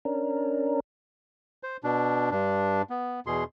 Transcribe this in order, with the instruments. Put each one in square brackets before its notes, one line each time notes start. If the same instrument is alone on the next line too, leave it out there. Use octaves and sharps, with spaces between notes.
[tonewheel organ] C#4 D4 A#4
[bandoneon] C5
B2 D4
G2 D4
B3
E2 B2 G#4 C6